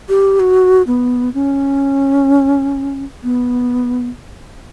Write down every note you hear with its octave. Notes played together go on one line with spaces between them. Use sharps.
G4
F#4
B3
C#4
B3